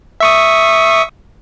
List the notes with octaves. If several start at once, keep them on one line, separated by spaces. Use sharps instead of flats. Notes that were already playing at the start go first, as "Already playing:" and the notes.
E5 C#6 D#6